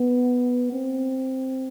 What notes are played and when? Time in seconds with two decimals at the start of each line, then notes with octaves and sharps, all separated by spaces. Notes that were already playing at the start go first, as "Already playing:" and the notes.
Already playing: B3
0.73 C4